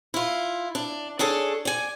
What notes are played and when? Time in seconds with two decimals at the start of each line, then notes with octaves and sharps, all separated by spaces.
0.14 E4 F4
0.75 D4
1.19 D4 G#4 A4 C#5
1.65 D5 G#5